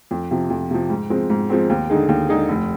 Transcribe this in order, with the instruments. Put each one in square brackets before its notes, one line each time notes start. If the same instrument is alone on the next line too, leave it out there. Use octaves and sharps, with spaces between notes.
[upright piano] F2
C3 F3
F2
C3 F3
G#2
F3 G#3 C4
G#2
F3 G#3 C4
D#2
D3 G#3 D#4 G#4
D#2
D3 G#3 D#4 G#4
F1